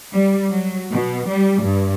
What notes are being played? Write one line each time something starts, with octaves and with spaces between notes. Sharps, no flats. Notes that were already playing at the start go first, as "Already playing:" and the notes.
G3
F#3
B2
G3
G2